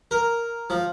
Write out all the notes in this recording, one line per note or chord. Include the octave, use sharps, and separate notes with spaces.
A#4
F3